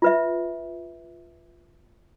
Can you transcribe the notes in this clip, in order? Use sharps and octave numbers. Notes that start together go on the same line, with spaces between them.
F4 B4 E5